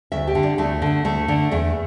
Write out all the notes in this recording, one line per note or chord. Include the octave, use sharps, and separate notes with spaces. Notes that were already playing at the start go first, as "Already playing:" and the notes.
D2 E5
G4
D3
D4
D2 A3
D3
D2 A3
D3
E2 A3